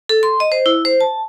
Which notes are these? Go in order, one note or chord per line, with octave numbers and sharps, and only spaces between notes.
A4
C6
D#5
C5
E4
C5
A5